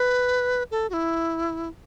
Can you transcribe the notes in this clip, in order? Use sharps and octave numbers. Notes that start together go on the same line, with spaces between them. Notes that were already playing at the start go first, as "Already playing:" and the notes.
Already playing: B4
A4
F#4
E4